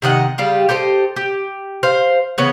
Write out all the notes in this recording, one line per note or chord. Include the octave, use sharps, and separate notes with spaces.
C3 D#3 D#5 F#5
C#3 G3 F4 G4
G4 A4 C5 D#5
G4
C5 F5
C#3 E3 B3 C#5